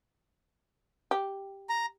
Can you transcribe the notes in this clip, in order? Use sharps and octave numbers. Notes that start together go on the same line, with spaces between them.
G4
A#5